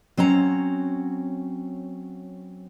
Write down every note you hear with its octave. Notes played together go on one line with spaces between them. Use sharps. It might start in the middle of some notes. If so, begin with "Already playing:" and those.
F#3 C4 C#4 A#5